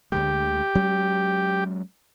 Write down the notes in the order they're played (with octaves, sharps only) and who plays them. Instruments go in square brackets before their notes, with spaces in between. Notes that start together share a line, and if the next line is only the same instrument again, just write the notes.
[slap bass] D2 D3 G#3 [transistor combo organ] G4
[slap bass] F#3 G#3 C#4